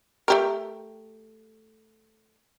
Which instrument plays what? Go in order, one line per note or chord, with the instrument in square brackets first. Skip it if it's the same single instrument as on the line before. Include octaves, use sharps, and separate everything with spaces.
[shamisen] A3 G4 A#4